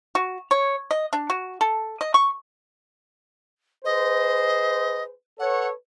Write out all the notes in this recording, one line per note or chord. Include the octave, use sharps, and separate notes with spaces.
F#4
C#5
D#5
D4
F#4
A4
D#5
C#6
G#4 B4 C5 D#5
A4 B4 C#5 F#5